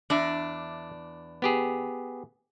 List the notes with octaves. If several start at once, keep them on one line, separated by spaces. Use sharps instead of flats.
E2 D4 D5 E5
B3 G4 G#4